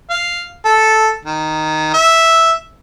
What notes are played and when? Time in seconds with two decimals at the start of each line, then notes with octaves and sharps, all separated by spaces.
0.10 F5
0.65 A4
1.25 D#3
1.94 E5